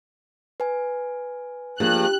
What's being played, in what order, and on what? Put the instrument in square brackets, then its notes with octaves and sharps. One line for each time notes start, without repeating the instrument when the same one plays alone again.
[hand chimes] B4 G#5
[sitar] G2 [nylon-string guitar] F3 A#3 G#4 [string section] F#6